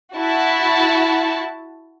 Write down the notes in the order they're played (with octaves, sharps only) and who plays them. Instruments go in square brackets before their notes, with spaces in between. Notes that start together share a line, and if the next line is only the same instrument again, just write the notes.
[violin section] E4 F#4 A5